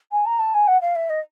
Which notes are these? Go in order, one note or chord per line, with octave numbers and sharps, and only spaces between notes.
G#5
A#5
A5
G#5
F#5
F5
E5
D#5